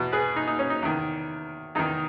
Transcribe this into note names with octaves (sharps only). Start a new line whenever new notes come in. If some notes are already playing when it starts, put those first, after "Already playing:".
Already playing: E2 B2
G#4 B4
D#4
D#4
C#4
D#4
E2 D#3
E2 D#3 D#4